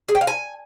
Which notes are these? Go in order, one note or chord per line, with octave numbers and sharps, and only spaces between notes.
G#4
G5
F5
G#5